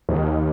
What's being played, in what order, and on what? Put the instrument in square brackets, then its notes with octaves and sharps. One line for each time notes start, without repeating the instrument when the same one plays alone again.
[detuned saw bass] D#2